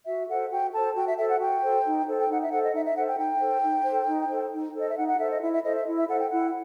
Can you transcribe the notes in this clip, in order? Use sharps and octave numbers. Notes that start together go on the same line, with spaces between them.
F#4 E5
A4 C5 F#5
F#4 G5
A4 C5 A5
F#4 G5
E5
A4 C5 E5
F#5
F#4 G5
A4 C5
D#4
A4 C5
G5
D#4 F#5
E5
A4 C5 F#5
D#5
D#4 E5
E5
A4 C5 F#5
G5
D#4 G5
A4 C5
D#4
A4 C5
D#4
A4 C5
D#4
A4 C5 D#5
E5
D#4 F#5
F#5
A4 C5 E5
D#5
E4 E5
E5
A4 C5 D#5
E5
E4
E5
A4 C5 F#5
G5
E4 F#5